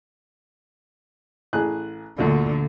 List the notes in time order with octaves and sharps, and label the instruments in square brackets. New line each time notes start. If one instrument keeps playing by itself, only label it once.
[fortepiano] A1 G#4 F#6
[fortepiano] D2 A#2 [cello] D3